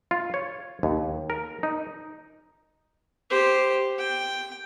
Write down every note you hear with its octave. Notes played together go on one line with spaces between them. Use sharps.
F4
C#5
D#2
A#4
D#4
G4 C5
G5